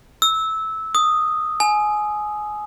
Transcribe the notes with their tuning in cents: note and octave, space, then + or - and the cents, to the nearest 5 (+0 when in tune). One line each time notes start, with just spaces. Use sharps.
E6 -15
D#6 -5
G#5 +20